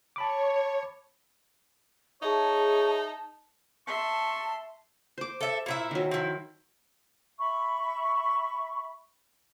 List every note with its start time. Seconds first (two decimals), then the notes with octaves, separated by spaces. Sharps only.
0.16 C#5 A5 B5 D6
2.22 D#4 G#4 C#5 E5 A5
3.87 E5 A5 C6 C#6
5.18 C5 D6
5.41 A4 E5
5.66 A#2 E4 E5
5.91 D#3 F#3
6.11 F3 E4
7.39 E5 B5 C#6